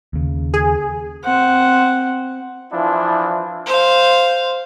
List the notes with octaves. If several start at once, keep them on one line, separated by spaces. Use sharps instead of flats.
D#2 C#3
G#4
C4 F#5
E3 F3 D4 E4
C5 F5